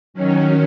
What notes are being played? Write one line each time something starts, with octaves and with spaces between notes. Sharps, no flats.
D#3 F#3 C#4